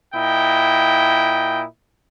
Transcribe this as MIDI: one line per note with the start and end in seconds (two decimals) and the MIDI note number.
0.14 1.63 46
0.14 1.63 64
0.14 1.63 75
0.14 1.63 79